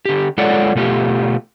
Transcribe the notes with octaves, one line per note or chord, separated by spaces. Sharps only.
D3 G4
G#3 F4 A4 C#5 D5 F#5
B2 A3 F4 G4